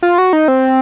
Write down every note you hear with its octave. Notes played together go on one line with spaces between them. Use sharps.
F4
F#4
D#4
C4